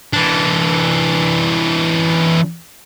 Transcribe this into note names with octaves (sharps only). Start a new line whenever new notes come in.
E3 D4